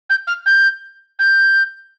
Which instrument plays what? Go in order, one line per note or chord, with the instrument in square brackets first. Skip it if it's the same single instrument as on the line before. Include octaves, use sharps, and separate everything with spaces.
[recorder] G6
F6
G6
G6